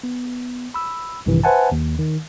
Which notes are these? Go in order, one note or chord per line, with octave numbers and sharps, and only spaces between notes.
B3
B5 E6
A#1 G2 C3 D#3 E3
B4 C5 E5 F#5 G#5 A5
D#2
D#3